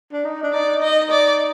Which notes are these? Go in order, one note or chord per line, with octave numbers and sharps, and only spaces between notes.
D4
D#4
D4
D#4 D5
D#4 D#5
D5